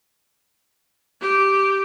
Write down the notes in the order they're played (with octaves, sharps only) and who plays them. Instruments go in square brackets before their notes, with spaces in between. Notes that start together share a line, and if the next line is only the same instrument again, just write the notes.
[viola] G4